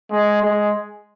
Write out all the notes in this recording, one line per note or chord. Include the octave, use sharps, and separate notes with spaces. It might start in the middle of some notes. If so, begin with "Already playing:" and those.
G#3
G#3